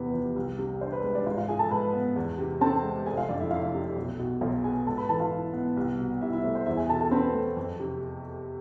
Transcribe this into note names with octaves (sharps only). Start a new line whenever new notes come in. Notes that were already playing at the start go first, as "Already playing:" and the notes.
Already playing: E2 C3 E3 B3 B4
F3
C2
C3
D4 C5
B4
G#3
D4 D5
G#2 F4 F5
F4 F5
F3 G#4 G#5
A4 A5
G#2 B4 B5
B3
E2
C3
C4 A4 A5
G#3
F1 G#4 G#5
F4 F5
F2 D4 D5
E4 E5
F1 F4 F5
C3
B1
B2
B1 F4 F5
B3 G#4 G#5
G#2 A4 A5
B4 B5
E3 A4 A5
F4 F5
E4
B3
C2
B2
C2 E4 E5
E4 E5
A3 C5
C5
E2 E4 E5
G#4 G#5
B2 A4 A5
A4 A5
C4 B4 B5
A3
F2
C3